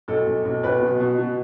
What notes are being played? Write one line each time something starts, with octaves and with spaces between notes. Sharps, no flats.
B1 A4
B1
B1
B1 B4
B2
B2
B2